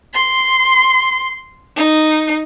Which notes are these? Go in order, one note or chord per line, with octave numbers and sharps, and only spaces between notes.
C6
D#4